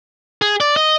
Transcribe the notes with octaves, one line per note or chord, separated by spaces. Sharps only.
G#4
D5
D#5